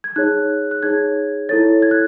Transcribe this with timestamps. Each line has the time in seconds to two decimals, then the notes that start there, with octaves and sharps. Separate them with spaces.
0.04 G#6
0.16 D#4 G#4 C#5 F#6
0.71 F#6
0.83 D#4 G#4 C#5 G#6
1.49 E4 A4 C#5 A6
1.82 G#6
1.91 F#6